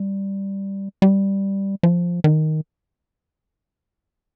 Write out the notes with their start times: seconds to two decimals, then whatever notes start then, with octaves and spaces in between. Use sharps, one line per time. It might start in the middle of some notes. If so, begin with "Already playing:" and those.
Already playing: G3
1.02 G3
1.83 F3
2.24 D#3